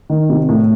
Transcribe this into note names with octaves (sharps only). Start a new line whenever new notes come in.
D#3
C3
A2